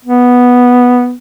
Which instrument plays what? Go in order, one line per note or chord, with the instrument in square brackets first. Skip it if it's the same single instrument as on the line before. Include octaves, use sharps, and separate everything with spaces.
[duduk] B3